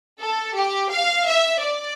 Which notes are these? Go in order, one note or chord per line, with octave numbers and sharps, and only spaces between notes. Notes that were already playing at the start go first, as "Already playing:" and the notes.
A4
G4
F5
E5
D5